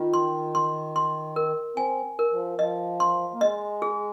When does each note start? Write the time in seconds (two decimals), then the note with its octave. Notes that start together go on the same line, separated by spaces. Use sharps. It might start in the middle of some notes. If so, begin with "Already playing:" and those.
Already playing: D#3 F4
0.14 C6
0.55 C6
0.96 C6
1.36 A#4
1.77 C4 G#5
2.19 A#4
2.32 F3
2.59 F3 D#5
3.00 C6
3.34 A#3
3.41 G#3 D#5
3.82 G#4